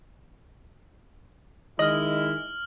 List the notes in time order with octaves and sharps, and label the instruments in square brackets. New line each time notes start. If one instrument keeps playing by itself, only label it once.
[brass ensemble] D#3 G#3 E4 [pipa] D#5 [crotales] F6 F#7